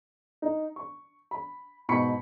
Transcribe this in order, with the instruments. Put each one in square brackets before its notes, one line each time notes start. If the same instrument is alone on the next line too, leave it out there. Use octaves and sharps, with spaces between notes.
[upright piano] D#4
C#6
B5
G#2 B2 B5 C#6 B6 C#7